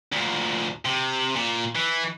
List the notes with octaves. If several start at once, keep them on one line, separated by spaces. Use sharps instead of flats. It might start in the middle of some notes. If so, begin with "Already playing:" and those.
D2 A#2
C3
A#2
E3